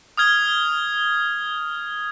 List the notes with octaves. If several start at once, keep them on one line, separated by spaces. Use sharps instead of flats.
D#6 F6 G#6 G7